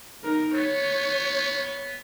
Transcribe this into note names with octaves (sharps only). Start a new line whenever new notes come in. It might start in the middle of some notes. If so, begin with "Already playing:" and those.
D#4 A#4
B3 C#5